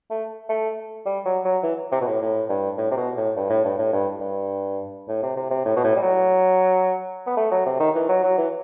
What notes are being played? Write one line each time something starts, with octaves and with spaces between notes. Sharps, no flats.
A3
A3
G3
F#3
F#3
E3
C3
B2
A2
A2
G2
A2
C3
B2
A2
G2
A2
G2
A2
G2
G2
A2
C3
C3
C3
A2
B2
A2
G3
F#3
B3
A3
F#3
C3
D#3
E3
F#3
F#3
E3